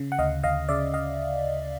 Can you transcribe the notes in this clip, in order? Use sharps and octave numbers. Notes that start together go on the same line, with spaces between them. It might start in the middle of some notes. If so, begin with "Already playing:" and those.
Already playing: C#3
F#5
D2 D#5 F5
D2 D#5 F5
C#3 D5 E5
D#5 F5